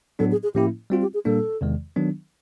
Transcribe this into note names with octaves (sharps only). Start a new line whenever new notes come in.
A2 F#3 B3 D4 A4
G#4
G#4
A2 F3 A#3 C#4 E4 G4
G3 C4 F4 F#4
G4
G#4
A#2 G3 A#3 D4 A4
E2 C3 D#3 G#3
D#3 F#3 B3 D4